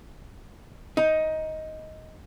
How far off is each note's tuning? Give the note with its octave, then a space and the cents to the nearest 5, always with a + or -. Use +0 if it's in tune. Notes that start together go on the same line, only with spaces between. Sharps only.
D#4 +10